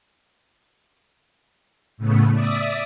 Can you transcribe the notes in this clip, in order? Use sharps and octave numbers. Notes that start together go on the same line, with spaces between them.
A2 C#3 A3 B3
D5 E5 D#6